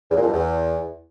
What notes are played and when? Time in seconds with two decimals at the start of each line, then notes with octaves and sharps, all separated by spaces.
0.10 E2
0.16 A#2
0.22 F2
0.28 G2
0.33 E2